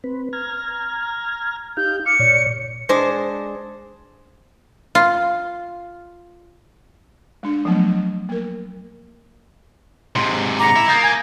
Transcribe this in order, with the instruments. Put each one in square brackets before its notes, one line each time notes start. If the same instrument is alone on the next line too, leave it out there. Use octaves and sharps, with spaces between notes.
[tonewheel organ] C4 B4
A#5 F6 G#6
[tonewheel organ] D#4 G4 F5 [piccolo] G6
[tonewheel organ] D6 F6 [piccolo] C#7
[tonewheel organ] A#2 C#5 D5
[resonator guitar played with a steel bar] G#3 D4 C5
[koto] F4
[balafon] G#3 D4
F3 F#3 A3 B3
A#3 A#4
[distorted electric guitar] G#2 C3 [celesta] C6
[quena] A#5 [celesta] D6 C#7
[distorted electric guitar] E4
[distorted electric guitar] A#3 [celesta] D#6 G6 A6
[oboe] G#5